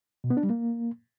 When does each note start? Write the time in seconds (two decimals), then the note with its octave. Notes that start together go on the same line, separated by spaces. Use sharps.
0.24 B2
0.30 B3
0.37 D4
0.43 G3
0.50 A#3